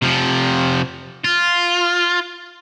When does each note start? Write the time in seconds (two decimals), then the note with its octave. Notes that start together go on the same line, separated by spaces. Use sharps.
0.02 C3 F3
1.24 F4